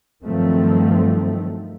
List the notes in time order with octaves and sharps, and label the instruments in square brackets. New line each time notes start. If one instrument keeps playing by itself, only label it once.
[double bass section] G2 D#3 F3 F#3 A3 C4